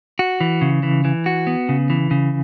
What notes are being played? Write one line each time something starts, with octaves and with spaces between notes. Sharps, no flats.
F#4
E3
C#3
E3
E3
F#4
B3
C#3
E3
C#3